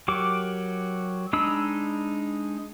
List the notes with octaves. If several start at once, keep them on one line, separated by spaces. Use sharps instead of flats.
F#3 F#4 G4 A#4 D6
G#3 D4 D#4 B5 E6